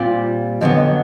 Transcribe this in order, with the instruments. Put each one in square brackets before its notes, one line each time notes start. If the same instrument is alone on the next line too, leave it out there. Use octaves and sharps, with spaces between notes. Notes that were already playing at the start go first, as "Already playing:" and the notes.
Already playing: [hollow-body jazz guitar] A#2 G3 C4 F4
[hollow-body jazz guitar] F2 D3 F#3 B3 [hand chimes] D#5